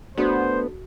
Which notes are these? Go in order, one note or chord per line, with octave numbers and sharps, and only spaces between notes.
A3 B3 D4 F#4 G#4 C5 D#6